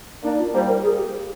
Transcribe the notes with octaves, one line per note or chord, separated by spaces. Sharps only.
A#3 D4 D#4
F4
G3 A#3 C5
A#4
G#4
G4